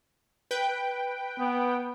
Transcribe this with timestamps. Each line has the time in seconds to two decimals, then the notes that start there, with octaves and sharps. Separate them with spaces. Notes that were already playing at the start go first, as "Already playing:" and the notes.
0.51 B4 G5
1.39 B3